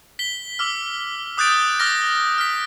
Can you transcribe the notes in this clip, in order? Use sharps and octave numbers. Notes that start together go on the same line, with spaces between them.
B6 G7
D6 E6 F6
D6 D#6 F#6 G6 A6 D7
D6 F6 A6 A#6
F6 B6